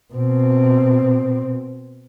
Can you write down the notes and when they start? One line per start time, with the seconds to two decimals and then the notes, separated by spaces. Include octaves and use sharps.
0.14 B2 C4